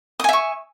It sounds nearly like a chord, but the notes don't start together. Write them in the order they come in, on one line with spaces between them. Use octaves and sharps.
D#6 G#5 E5 C#6